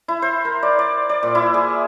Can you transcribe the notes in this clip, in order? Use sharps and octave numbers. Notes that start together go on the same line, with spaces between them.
E4
C5
A#4
D5
D5
D5
A#2
E4
G#4